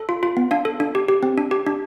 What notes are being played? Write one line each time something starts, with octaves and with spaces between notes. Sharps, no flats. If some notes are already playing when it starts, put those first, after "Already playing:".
Already playing: A4
F4
F4
B3
D4 F5
A4
D4
G4
G4
C4
D4
G4
D4